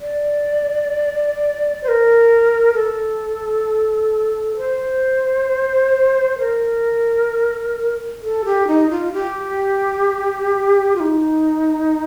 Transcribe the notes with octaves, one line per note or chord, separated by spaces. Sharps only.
D5
C5
A#4
A4
C5
A#4
A4
G4
D#4
F4
G4
F4
D#4